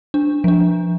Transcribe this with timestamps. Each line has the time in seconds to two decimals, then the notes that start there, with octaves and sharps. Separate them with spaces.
0.14 D4
0.44 F3 D4